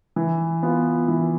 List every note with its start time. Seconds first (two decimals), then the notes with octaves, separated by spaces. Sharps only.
0.16 E3
0.63 B3 F4
1.08 E3